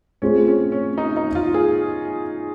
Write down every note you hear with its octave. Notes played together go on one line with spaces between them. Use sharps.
A3 C4 C#4 F4 G#4 C5
C#4
C#4
D#4
D#4
F4
G#4